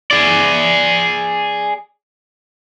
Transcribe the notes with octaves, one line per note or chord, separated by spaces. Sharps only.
G#4 D5